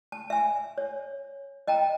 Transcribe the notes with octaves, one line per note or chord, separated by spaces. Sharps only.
A5
E5 G#5
C#5
D#5 G5 A5 A#5